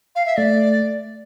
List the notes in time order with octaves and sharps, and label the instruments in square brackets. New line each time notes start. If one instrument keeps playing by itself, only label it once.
[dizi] F5
E5
[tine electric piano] A3 [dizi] D5